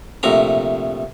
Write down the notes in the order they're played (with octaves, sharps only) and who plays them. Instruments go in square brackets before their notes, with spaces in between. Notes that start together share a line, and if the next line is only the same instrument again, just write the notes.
[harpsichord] A#1 C3 A3 A#5